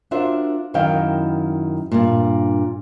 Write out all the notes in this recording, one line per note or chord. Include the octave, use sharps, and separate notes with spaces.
D4 F4 F#4 A#4 C5 E5
F#2 D#3 E4 D#5 F5 G5
G2 A#2